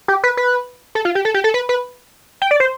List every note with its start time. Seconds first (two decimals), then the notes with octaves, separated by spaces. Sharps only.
0.08 G4
0.24 B4
0.37 B4
0.95 A4
1.05 F4
1.15 G4
1.25 A4
1.34 G4
1.44 A4
1.54 B4
1.69 B4
2.42 G5
2.51 D5
2.60 C5